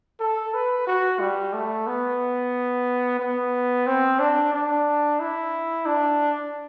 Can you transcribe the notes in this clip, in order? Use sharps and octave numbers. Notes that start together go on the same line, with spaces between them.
A4
B4
F#4
G3
A3
B3
B3
C4
D4
D4
E4
D4